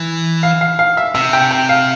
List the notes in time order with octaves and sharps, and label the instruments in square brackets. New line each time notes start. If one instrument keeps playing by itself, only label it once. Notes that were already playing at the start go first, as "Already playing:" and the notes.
Already playing: [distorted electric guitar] E3
[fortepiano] F5
F5
F5
E5
[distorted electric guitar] C3 [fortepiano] E5
[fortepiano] G5
G5
F5